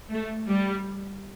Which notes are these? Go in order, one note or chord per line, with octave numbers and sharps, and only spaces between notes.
A3
G3